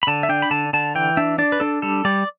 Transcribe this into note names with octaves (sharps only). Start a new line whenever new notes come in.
B5
D3 A5
E5
D4 G5
B5
D3 A5
D3 A5
E3 G5
D4 E5
D4 D5
B4
D4 A4
G3 A4
G3 D5